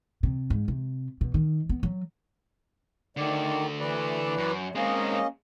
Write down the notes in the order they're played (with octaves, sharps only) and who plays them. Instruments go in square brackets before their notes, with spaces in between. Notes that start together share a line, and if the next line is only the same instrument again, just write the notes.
[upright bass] C3
G#2
C3
B2
D#3
B3
F#3
[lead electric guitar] D3 A3 [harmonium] D#3 D5
[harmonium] E3 B4 D5
[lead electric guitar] F#2
[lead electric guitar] G#3 C4 [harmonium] A#3 C#4 D#5